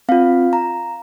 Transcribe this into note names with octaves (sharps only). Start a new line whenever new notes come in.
C4 F4 F5
A#5